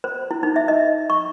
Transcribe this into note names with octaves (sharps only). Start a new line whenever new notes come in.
C5
E4
D#4
E5
D#5
C#6